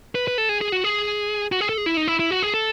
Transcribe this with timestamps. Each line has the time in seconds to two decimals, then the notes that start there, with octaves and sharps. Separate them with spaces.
0.15 B4
0.28 B4
0.38 A4
0.49 G#4
0.61 G#4
0.72 F#4
0.84 G#4
1.52 F#4
1.61 G#4
1.69 A4
1.78 G#4
1.86 E4
1.97 D#4
2.08 E4
2.19 E4
2.31 F#4
2.42 G#4
2.54 A4